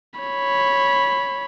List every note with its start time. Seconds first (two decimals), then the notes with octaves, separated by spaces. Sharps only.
0.20 C#5 B5